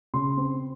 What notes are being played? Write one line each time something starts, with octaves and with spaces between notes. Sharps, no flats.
C#3 C6
C4